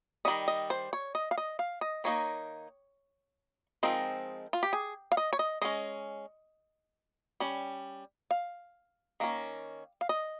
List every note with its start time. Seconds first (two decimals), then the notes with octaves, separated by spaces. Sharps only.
0.25 D#3 G3 C#4 D#5
0.48 D#5
0.70 C5
0.93 C#5
1.15 D#5
1.31 F5
1.38 D#5
1.59 F5
1.81 D#5
2.04 D#3 A#3 D#4 C#5
3.83 F3 G#3 C4 D#4 A#4
4.53 F4
4.63 G4
4.73 G#4
5.12 F5
5.17 D#5
5.33 C#5
5.39 D#5
5.62 G#3 C#4 D#5
7.40 G3 C#4
8.31 F5
9.20 D#3 A#3 C#4
10.01 F5
10.09 D#5